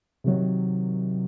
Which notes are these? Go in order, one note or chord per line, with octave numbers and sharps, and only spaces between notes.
C3 D#3 F#3